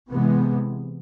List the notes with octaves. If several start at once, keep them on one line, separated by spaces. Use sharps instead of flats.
C3 E3 G#3 B3